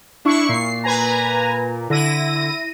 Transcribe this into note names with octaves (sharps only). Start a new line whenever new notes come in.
D4 E4 C#6
A#2 C7
B4 G#5 A#5
D3 E4 A#6 D#7